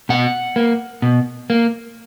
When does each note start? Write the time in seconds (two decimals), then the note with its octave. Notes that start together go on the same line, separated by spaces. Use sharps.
0.09 B2 F#5
0.56 A#3
1.02 B2
1.50 A#3